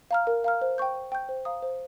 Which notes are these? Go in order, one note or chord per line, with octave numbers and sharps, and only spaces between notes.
F5 A#5 F6
A#4
F5 A#5 F6
C5
G5 C#6 G6
C5
G5 C#6 G6
C5
F5 A#5 D#6
C5